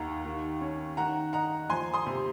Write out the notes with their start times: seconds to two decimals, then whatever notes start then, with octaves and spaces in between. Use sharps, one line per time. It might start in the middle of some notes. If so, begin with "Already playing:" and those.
Already playing: D#2 D#3 F5 F#5 A#5
0.25 D#3
0.61 C#4
0.97 D#3 F#5 A#5
1.33 D#4 F#5 A#5
1.69 F3 G#5 C6
1.94 C6 D#6
2.07 C3